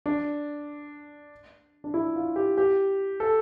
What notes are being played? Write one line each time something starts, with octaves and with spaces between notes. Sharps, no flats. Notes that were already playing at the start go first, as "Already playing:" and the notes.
D4
D4
E4
F4
G4
G4
A4